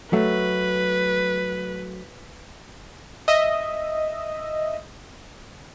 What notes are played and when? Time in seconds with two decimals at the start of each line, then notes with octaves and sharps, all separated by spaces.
0.13 F#3 A3 B4
3.28 D#5 E5